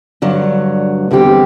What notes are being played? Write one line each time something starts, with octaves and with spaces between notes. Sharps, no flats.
G2 D3 F#3
E2 D3 G3 C4 G4